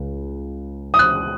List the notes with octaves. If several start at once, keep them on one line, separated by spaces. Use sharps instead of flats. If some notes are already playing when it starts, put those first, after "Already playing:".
Already playing: C#2
D#6
F#6